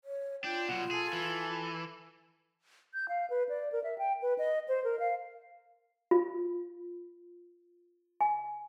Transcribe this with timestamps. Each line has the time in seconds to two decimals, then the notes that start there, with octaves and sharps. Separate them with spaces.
0.04 C#5
0.44 D4 F4 G5
0.68 B2 F#3 F#5
0.91 G#4 A4 G#5
1.13 E3
2.94 G6
3.09 F5
3.30 B4
3.49 D5
3.72 A#4
3.84 E5
3.98 G5
4.22 B4
4.38 D#5
4.68 C5
4.84 A#4
5.00 F5
6.11 F4
8.21 G#5